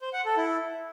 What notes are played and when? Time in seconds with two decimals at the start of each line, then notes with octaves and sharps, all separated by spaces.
0.01 C5
0.13 F#5
0.25 A4
0.37 E4